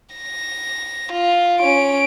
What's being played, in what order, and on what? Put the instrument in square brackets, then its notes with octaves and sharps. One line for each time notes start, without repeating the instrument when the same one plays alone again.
[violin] A#6
F4
C#4 D7